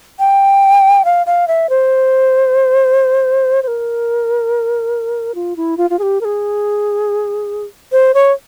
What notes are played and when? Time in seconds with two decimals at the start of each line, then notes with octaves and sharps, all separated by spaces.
0.19 G5
1.05 F5
1.26 F5
1.48 E5
1.69 C5
3.63 C5
3.67 A#4
5.35 F4
5.56 E4
5.77 F4
5.90 F4
5.99 G#4
6.02 G4
6.21 A#4
6.25 G#4
7.92 C5
8.14 C#5